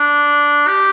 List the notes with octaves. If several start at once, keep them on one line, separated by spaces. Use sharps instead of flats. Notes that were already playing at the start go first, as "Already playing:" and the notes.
Already playing: D4
G4